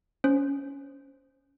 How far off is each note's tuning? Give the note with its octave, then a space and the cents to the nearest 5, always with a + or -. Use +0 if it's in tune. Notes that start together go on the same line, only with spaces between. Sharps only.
C#4 +15 C5 +0